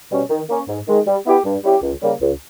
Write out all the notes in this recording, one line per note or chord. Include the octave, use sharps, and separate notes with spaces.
B2 G3 C#4
D#3
A#3 C#4
G#2
D#3 G#3
G3
B3 E4 G4
G2
G3 C#4 E4 G4
C#2
C#3 G3 A#3
C#2